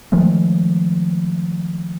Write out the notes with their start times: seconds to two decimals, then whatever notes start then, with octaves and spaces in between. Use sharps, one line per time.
0.12 D#3 F3 G#3 A3